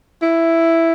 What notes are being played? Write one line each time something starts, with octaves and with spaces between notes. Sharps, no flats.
E4